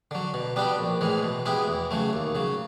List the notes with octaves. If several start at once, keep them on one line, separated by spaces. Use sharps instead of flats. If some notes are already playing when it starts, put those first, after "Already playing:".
D3 F#3
B2
G3 B3 D4 G4
A#1
A2 E3 G#3
B2
G#3 B3 E4 G4
E2
C#3 F#3 A3
D#2
C#3 F#3